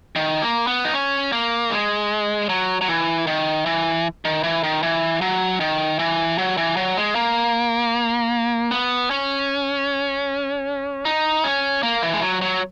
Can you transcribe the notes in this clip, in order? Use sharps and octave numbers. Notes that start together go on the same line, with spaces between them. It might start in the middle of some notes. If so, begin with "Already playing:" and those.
D#3
A#3
B3
D#4
C#4
A#3
G#3
F#3
F#3
E3
D#3
E3
D#3
E3
D#3
E3
F#3
D#3
E3
F#3
E3
F#3
G#3
A#3
B3
C#4
D#4
C#4
A#3
E3
G#3
F#3
F#3